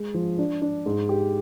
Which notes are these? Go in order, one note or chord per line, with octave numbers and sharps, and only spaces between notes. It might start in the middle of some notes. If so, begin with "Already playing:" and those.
Already playing: G#3
F3
D4
D4
G#2
G4